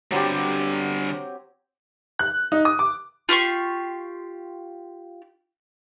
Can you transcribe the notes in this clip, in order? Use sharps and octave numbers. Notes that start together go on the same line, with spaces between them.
D3 F#3 G3 C4 G4
F#6
D#4
D#6
D6
F4 G4 C6 C#6